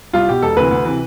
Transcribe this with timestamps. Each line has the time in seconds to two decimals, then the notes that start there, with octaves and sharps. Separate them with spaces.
0.13 C2 F4
0.29 B2 G4
0.42 E1 A4
0.57 D2 C3 E3 B4
0.71 D2
0.85 C3 E3